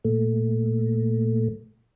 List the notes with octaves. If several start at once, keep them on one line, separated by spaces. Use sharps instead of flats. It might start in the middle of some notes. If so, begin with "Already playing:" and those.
A#2 A3